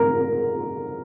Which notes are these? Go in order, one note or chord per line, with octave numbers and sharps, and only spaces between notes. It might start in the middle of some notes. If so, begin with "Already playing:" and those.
Already playing: A#4